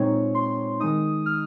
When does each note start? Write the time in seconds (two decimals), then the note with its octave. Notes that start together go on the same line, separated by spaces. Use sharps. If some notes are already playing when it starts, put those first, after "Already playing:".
Already playing: A#2 G#3 C4 D#4 C#5
0.35 C6
0.80 D#3 G#3 D#4 D#6
1.26 F6